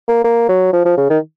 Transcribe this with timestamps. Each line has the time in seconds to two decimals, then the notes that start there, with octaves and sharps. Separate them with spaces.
0.08 A#3
0.24 A#3
0.49 F#3
0.73 F3
0.85 F3
0.97 C#3
1.10 D#3